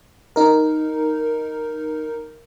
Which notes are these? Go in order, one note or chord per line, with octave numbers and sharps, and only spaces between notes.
D#4 A#4